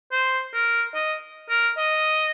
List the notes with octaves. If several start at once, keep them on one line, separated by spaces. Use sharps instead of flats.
C5
A#4
D#5
A#4
D#5